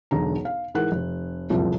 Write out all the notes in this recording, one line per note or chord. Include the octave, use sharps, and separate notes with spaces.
E1 B1 D3 A#5
F5
G#2 E3 G#4 A#4 F#5 F#6
F1
F#1 C2 F2 A#2 F3